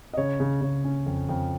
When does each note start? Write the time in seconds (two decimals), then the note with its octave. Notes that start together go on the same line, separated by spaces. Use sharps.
0.13 D#5
0.17 C#3 C#5
0.40 C#3
0.61 C#3
0.85 C#4
1.06 F2
1.29 F2